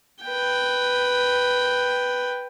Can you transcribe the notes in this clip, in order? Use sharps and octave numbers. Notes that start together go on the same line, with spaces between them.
B4 G5